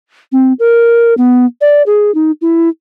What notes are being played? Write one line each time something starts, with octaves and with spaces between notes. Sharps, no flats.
C4
A#4
B3
D5
G#4
D#4
E4